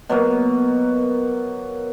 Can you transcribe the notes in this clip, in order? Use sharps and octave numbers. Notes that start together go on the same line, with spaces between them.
B2 F#3 A#3